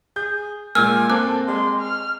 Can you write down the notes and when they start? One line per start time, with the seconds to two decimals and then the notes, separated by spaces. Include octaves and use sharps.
0.16 G#4 G6
0.75 A#2 G#3 A#3 G#5 E6 F6
1.10 A#3 C4 A4 D6 F#6
1.48 G#3 C6
1.81 F6